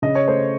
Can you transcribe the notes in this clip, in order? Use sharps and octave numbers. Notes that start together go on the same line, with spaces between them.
C#3 D#5
C#5
A3 C5